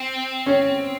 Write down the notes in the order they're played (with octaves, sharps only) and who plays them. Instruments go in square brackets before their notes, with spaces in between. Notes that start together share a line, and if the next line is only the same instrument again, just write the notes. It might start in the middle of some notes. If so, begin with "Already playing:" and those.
Already playing: [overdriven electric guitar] C4
[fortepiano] C#4